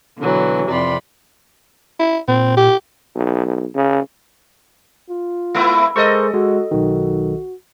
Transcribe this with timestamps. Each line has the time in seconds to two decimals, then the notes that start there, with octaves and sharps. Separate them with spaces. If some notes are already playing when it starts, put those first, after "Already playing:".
0.18 B2 D3 E3 F#3
0.69 F2 C3 D5 B5 C6
1.99 E4
2.28 A#2 C4
2.57 G4
3.15 B1
3.75 C#3
5.09 F4
5.55 G#3 B3 E4
5.96 G#3 A4 A#4 C5 D#5 C#6
6.34 G#3 F#4
6.71 B1 D#3 F#4